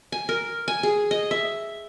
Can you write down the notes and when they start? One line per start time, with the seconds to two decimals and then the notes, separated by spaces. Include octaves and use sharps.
0.12 G#5
0.29 A#4
0.68 G#5
0.83 G#4
1.11 D#5
1.31 E5